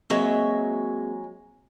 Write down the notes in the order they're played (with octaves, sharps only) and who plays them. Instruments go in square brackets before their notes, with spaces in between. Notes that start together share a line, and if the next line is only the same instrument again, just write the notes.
[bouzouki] F#3 G#3 E5 [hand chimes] A#3 C4 G#4